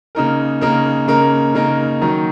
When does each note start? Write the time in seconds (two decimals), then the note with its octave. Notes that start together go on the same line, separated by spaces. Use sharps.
0.15 C#3 A#3 D#4 A#4
0.61 C#3 A#3 D#4 A#4
1.08 C#3 A#3 D#4 A#4
1.55 C#3 A#3 D#4 A#4
2.01 D#3 F#3 D#4